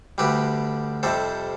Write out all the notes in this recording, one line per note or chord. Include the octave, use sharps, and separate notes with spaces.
D2 D3 G3 G4 B4
F2 C3 G3 A4 C5